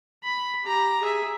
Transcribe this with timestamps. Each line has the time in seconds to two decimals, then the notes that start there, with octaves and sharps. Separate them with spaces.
0.24 B5
0.65 G4 A#5
1.01 G#4 E5